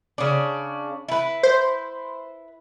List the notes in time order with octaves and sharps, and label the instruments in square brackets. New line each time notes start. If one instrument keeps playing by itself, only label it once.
[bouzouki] C#3 D4
E4 B4
[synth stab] C5